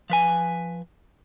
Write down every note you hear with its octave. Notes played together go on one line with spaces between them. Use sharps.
F3 B4 G#5